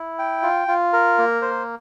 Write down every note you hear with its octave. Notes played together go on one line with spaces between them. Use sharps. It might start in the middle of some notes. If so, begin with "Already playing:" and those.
Already playing: E4
G5
F4
F4
A#4
A#3
C5